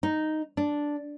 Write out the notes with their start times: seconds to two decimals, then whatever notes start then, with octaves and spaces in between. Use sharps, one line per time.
0.03 D#4
0.57 D4